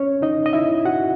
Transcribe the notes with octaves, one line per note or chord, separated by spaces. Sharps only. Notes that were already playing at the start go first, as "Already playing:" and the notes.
Already playing: C#4 C#5
D#4 D#5
D#5
E4 E5
F#4 F#5